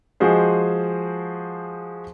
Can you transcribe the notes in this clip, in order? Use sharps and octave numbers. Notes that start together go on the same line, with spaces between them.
F3 G#3 F#4 G#4 C5